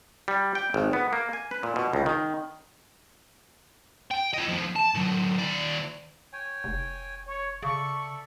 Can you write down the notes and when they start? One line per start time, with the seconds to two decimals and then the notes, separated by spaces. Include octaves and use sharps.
0.28 G3
0.55 G5
0.74 G#1
0.93 B3
1.13 A#3
1.33 G#5
1.51 B4
1.63 A#2
1.76 B2
1.93 C#2
2.06 D#3
4.11 G5
4.34 F4 D#5
4.48 D#2 F3
4.76 A5
4.95 A2 F#3
5.38 D#2 D5
6.33 C#5 G5 G#5
6.64 F1
7.27 C#5
7.63 C#3 A4 D5 E5 C#6